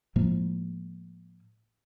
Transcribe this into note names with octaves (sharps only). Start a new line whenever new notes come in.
A2 F3 G#3 A#3